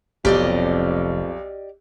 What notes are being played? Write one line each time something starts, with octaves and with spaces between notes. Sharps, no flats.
F1 B1 F2 G#2 C4 G4 D5 D#5